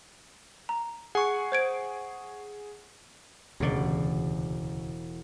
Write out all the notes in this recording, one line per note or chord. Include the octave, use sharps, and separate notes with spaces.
A#5
G#4 F#5 C#6
C5 G#6 D7
E1 D2 C#3 D5